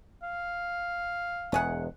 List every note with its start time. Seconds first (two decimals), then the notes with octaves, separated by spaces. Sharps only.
0.23 F5
1.52 E1 E2 A3 G#4 F#5